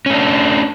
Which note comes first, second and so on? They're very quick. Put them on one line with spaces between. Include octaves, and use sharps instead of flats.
C#4 A3 D4